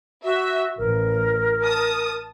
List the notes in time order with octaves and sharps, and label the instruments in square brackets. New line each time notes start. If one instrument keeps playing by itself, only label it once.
[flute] F#4 [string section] E5
[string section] A1 [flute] A#4
[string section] A5 D#6